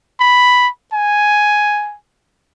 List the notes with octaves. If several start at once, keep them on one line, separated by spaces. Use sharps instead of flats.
B5
G#5